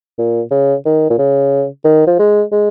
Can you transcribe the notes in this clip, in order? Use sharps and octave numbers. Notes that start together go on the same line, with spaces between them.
A#2
C#3
D#3
A#2
C#3
D#3
F3
G#3
G#3